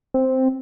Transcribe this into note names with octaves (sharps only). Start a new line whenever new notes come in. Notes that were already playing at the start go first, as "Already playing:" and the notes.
C4